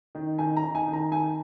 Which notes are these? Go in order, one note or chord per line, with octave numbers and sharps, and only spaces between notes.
D#3
D#3 G#5
A#5
D#3
G#5
D#3
A#5
D#3 G#5